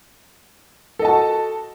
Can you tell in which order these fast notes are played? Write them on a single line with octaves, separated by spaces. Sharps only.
A4 D#5 A5 F#4